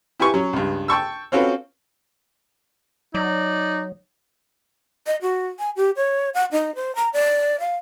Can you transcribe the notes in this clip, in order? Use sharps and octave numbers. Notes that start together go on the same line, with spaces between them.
E4 G4 B4 G#5 C#6
F#3 C#4
C#2 G2
G5 A5 C#6 E6
C4 C#4 F4 F#4 A4 B4
F#3 D#4 D5
D#5
F#4
G#5
G4
C#5
F#5
D#4
C5
A#5
D5
F5